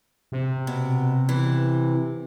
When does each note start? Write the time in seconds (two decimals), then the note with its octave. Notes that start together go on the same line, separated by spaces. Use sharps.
0.32 C3
0.67 B2
1.29 E3